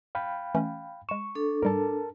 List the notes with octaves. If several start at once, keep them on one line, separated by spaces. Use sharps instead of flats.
F5 G5 B5
E3 A3 C#4
G#3 C#6 E7
D4 A4
G#2 G3 A#4 A5